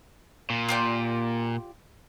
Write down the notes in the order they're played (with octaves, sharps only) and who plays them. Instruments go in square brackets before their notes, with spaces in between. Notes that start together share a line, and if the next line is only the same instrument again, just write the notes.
[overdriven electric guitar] A#2
[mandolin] F4 G4 D5